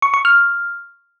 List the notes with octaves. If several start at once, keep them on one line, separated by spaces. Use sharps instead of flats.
C#6
C#6
F6